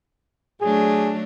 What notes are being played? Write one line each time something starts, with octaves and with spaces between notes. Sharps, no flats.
F#3 A3 D4 G#4